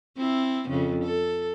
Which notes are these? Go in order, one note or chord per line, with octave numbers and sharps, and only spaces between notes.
C4 E4
F2 C#3
A4